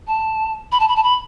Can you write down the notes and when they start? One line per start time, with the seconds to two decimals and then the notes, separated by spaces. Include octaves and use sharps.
0.07 A5
0.72 B5
0.80 A5
0.88 B5
0.96 A5
1.03 B5